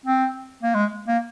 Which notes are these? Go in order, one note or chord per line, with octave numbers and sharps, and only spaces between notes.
C4
A#3
G#3
A#3